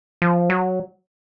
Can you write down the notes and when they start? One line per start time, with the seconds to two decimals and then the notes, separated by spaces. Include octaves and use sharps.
0.22 F3
0.50 F#3